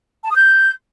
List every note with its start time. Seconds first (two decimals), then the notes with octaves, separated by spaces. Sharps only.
0.24 A5
0.30 D#6
0.36 G6